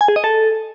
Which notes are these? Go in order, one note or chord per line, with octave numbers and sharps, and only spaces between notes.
G#5
G#4
D#5
A4